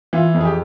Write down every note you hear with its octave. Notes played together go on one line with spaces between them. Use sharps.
E3 F4
F2
G#4
G4